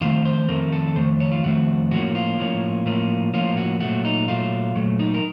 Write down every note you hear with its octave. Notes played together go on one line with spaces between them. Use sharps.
F2 D#3 A3 C4 F4
C5
F2 D#3 A3 C4 A#4
A4
F2 D#3 A3 C5
C#5
F4
F2 D#3 A3 C4 F#4
A2 F3 A#3 C#4 F#4
F4
A2 F3 A#3 C#4
A2 F3 A#3 C#4
A2 F3 A#3 C#4 F4
F#4
A#2 F#3 A3 F#4
D#4
A#2 F#3 A3 F4
A#2 F#3 A3
D#4
A#4